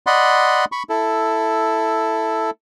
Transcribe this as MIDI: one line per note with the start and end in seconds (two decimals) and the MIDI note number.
0.07 0.65 74
0.07 0.65 75
0.07 0.65 78
0.07 0.65 83
0.07 0.65 84
0.72 0.83 83
0.72 0.83 85
0.89 2.50 64
0.89 2.50 69